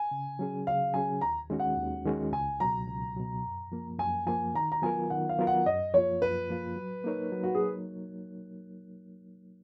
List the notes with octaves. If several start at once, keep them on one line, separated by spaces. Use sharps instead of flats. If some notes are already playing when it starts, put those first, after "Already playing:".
Already playing: G#5
C#3
F#3 C#4 G#4
C#3 F5
F#3 C#4 G#4 G#5
D#2 A#5
D#3 G#3 C#4 F#4
F#5
D#2
D#3 G#3 C#4 F#4
C#2 G#5
B2 F#3 A#5
C#2
B2 F#3
F#2
F3 A#3
F#2 G#5
F3 A#3 G#5
D#3 A#5
A#5
F#3 B3 F4 A#4 G#5
D#3 F#5
F5
F#3 B3 F4 A#4
F#5
F#2 D#5
F3 A#3 F4 C#5
F#2 B4
F3 A#3 F4
F#3
A#3 D#4 A#4 C#5
F#3
F#4
G#4